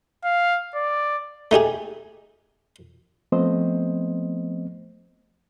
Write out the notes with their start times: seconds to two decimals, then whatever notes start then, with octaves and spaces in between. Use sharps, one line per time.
0.25 F5
0.75 D5
1.51 A3 D#4 G4 G#4
3.32 F3 A3 B3 C4 C5 D#5